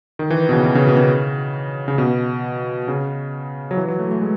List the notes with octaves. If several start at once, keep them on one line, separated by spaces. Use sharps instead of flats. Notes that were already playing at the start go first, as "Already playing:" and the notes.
D#3
E3
B2
C#3
B2
C#3
B2
C#3
C#3
B2
C#3
F#3
E3
F#3
A3
A3
G#3